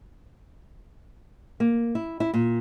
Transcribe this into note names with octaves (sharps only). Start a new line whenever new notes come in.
A#3
E4
E4
A#2